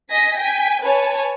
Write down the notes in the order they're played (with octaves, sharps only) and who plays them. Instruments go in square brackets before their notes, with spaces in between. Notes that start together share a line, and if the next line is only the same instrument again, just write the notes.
[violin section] D#5 G#5 A#6 B6
G5 G#5 B6
B4 C#5 G#5 A5